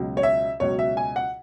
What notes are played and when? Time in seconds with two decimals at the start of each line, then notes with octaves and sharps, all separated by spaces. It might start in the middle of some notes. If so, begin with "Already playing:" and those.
Already playing: C#2 B2 F#3
0.17 C#5
0.23 E5
0.60 C#2 B2 F#3 C#5
0.79 E5
0.97 G#5
1.16 F#5